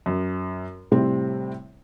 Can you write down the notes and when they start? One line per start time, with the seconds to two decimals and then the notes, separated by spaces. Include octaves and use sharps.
0.06 F#2
0.91 A2 C3 G3 C4 E4